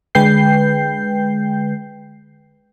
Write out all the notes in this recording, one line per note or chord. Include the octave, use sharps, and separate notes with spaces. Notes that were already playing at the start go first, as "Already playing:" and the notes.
D3 G#3 B4 G5 G6 C7